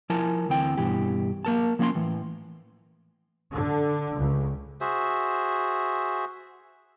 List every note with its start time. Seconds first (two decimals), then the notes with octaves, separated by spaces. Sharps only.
0.10 F3 E4 A#4 G#5 A5
0.49 D2 E3 C4 G5
0.77 G2 B2 E3 G4
1.45 A#3 A#4 A5
1.79 F3 A#3 C#4 E5 C6
1.95 A2 E3
3.52 D3
4.18 C#2
4.81 F#4 G#4 C5 E5